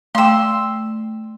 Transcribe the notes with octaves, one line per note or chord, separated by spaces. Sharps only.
A3 F5 G5 C6 E6